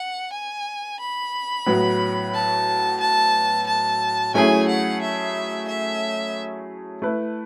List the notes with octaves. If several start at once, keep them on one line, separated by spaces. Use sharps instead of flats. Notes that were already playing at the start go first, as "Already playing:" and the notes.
Already playing: F#5
G#5
B5
A2 F#3 B3 F#4
A5
A5
A5
F#3 A3 C#4 E4 G#4 G#5
F#5
E5
E5
A3 E4 B4